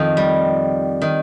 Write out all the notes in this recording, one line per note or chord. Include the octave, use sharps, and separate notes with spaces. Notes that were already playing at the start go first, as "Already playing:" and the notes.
Already playing: F2 D#3
G3
D#3